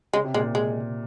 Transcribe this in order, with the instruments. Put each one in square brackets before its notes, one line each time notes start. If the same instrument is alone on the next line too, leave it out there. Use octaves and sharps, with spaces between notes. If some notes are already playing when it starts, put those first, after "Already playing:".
[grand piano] C#3 [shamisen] G#3
[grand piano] C3
[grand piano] A#2 [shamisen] G#3
[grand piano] C3
[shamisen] G#3